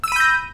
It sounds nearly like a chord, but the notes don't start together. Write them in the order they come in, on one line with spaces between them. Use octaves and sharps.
E6 D#7 B5 G6 A#6